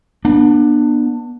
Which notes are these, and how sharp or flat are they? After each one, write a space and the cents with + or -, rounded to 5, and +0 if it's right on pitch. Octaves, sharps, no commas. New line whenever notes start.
B3 -30 D4 +20